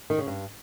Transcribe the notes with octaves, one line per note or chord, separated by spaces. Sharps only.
D#3
C#3
G2